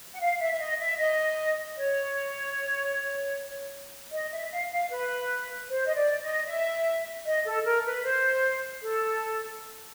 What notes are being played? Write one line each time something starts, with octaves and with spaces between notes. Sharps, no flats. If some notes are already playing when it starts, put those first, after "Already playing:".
F#5
F5
E5
E5
D#5
E5
D#5
C#5
D#5
E5
F5
F5
B4
C5
D#5
D5
D#5
E5
D#5
A4
A#4
B4
C5
A4